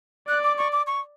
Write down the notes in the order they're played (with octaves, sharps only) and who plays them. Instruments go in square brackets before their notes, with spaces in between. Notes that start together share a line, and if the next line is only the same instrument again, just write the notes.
[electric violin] D5 [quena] F#6
[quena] D6
C#6
D6
C#6